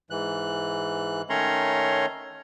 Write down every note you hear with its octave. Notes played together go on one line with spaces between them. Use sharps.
G#2 E3 F#6
D#3 A3 C#4 C#5 A#5 C6